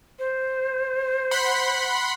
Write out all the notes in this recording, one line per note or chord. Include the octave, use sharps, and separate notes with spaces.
C5
F#5 B5 C6